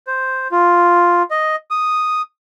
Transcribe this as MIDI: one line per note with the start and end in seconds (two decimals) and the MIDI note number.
0.07 0.48 72
0.52 1.23 65
1.31 1.56 75
1.71 2.22 87